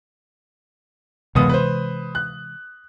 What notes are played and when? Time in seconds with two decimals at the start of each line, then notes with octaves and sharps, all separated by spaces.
1.35 F#1 C3 E3 G#3 B3 D#6
1.49 B4 C5
2.15 F#6